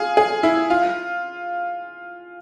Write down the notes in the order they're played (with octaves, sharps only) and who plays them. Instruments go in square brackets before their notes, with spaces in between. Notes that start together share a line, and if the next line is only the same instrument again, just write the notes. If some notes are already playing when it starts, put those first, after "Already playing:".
Already playing: [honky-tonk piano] F4 G#4
G#4
E4
F4